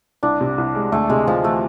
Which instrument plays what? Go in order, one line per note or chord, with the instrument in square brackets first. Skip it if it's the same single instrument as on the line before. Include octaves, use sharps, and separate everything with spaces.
[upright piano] C2 [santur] D4
[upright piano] C3
C2
G#3
[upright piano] D2 [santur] A3
[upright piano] C3 [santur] G#3
[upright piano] D2 [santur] F3
[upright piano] E3 [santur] A3